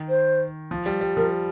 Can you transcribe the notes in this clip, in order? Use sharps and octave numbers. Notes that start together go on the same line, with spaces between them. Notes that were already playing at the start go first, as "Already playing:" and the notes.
Already playing: D#3
C5
F3
G3
G3
F3 A#4